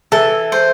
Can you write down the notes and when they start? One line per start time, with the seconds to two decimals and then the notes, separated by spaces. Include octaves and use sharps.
0.12 E3 A4
0.52 C5